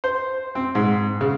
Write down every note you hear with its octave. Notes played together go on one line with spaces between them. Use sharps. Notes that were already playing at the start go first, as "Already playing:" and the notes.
C5
C4
G#2
C#3